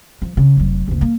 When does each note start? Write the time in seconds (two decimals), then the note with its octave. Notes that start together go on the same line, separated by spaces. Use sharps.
0.22 F3
0.37 C#3
0.57 F1 F#3
0.88 F#1 D2
1.01 A#3